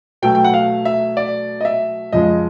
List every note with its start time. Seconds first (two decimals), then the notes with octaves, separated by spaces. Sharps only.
0.22 B2 F#3 A3 G5
0.35 G5
0.44 F#5
0.54 F5
0.85 E5
1.17 D5
1.61 D#5
1.65 E5
2.13 F2 C#3 F3 G#3 D#5